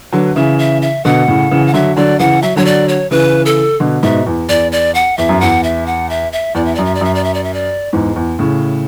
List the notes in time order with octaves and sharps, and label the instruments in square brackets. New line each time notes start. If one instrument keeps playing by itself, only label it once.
[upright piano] D3 F#3 [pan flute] B4
[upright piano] C#3 E3 [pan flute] E5
[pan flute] E5
E5
[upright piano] B2 D3 [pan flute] F#5
[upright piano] A2 C#3
C#3 E3
[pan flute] F#5
[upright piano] D3 F#3 [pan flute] E5
[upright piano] D3 F#3 [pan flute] D5
[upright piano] C#3 E3 [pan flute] F#5
[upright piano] F#3 [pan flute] E5
[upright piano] D3 F#3 [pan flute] C#5
[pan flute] D5
C#5
[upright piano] C#3 E3 [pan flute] B4
[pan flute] A4
[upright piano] B2 D3
[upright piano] G#2 B2 [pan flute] E5
[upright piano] E2
[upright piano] E2 [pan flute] D5
[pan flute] D5
F#5
[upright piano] E2 [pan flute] E5
[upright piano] F#2
[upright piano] E2 [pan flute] F#5
[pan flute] E5
F#5
E5
E5
[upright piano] E2 [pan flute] D5
[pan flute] E5
[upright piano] F#2 [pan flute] D5
[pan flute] E5
D5
[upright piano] F#2 [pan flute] E5
[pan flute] D5
E5
D5
E5
D5
[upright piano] E2 G#2
E2
A2 C#3